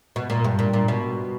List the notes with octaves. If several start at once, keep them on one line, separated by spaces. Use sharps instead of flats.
B2
A#2
G2
A#2
A#2
B2